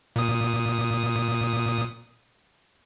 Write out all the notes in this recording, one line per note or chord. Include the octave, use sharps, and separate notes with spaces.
A#2 D#6